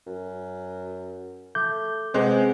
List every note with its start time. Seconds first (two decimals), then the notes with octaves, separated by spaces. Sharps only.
0.07 F#2
1.55 A3 D6 G6
2.14 C3 G#3 B3 G#4 C5 F#5